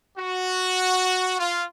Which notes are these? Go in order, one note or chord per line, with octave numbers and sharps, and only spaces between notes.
F#4
F4